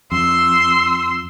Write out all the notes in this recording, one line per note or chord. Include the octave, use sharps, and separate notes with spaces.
F2 C6 E6